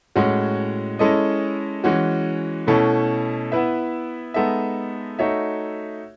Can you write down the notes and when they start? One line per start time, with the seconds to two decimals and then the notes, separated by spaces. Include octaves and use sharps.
0.16 A2 G#3 C#4 F#4
0.99 G#3 C#4 E4 A4 D#5
1.84 E3 G#3 C#4 F#4
2.67 B2 A3 C#4 E4 A4
3.52 B3 E4 B4 E5
4.34 G#3 B3 D#4 A4 E5
5.19 A3 D#4 F#4 C#5 E5